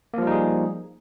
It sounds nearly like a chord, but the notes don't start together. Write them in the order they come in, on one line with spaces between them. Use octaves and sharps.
A#3 F3 G3 D#4 G#4